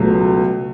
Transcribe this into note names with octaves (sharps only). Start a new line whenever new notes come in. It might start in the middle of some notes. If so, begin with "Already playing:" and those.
Already playing: C#2 B2 F#3 A3